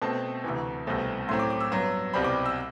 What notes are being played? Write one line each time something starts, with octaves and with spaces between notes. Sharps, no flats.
B2 A3 C4 A5
D2 C3 E3
C2 B2 A3 C4
A2 F#3 A3 C4 C6
D6
D6
E6
G2 F#3 B3
C2 B2 G3 C4 B5
D6
E6